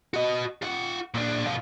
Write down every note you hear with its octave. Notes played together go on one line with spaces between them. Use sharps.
F#4 D#5
F4 F#5
A#2 D4
B2 F4